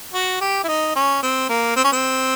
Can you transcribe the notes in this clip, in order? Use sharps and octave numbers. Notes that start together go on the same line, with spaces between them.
F#4
G4
E4
D#4
C#4
C4
A#3
C4
C#4
C4